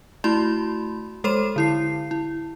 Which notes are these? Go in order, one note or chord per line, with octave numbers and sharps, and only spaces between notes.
A3 E4 F#4 B5 C6
G#3 A4 C5 C6 E7
D3 E4 C7
E4